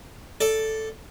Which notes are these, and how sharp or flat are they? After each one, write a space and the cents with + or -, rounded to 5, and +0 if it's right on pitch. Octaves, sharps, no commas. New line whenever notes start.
A4 +0 D5 +0